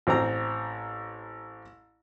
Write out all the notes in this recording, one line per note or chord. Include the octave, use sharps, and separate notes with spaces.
A1 C4 A#5